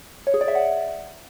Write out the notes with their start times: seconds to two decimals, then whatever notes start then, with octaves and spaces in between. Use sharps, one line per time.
0.27 C#5
0.34 G#4
0.41 D5
0.48 E5
0.55 F#5